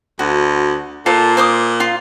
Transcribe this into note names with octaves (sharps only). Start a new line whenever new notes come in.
D2 F#4
A#2 F4 A4 C5
C5 D6 D#6
F4 F5 C6